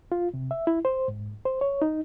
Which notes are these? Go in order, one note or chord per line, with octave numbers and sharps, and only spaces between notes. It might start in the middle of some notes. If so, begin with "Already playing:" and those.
F4
C3
E5
E4
C5
G#2
C5
C#5
D#4